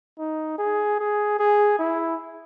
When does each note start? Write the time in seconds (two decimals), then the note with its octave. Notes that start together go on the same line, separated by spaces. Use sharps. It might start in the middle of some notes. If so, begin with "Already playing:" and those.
0.19 D#4
0.58 G#4
0.99 G#4
1.39 G#4
1.79 E4